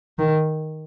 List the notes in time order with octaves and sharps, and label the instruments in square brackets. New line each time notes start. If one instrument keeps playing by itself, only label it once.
[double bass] D#3